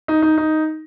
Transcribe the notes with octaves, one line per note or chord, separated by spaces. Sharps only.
D#4
D#4
D#4